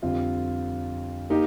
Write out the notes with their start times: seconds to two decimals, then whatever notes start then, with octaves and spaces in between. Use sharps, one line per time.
0.02 F2 D3 G3 C4 F4
1.30 A#3 D#4 G4